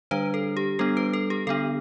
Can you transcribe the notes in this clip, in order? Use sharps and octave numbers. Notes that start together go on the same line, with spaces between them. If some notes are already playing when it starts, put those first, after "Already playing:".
D3 G3 D4 B4
A4
G4
G3 B3 D4 A4
B4
A4
G4
D3 B3 D4 A4